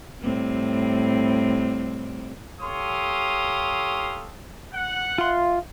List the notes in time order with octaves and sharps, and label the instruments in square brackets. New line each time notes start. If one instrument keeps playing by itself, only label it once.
[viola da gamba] A2 G3 C4
[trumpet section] G4 A4 C#5 F5 C6 D#6
F#5
[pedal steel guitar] F4 C6 [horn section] E5 F5